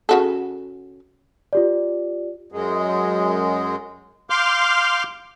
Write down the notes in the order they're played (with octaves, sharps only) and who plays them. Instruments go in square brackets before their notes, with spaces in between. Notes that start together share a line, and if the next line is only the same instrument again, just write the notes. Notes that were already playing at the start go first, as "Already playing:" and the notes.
[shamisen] C#3 F#4 A4
[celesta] F4 G4 D5
[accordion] F#2 G#3
F5 C6 D6 F6 G6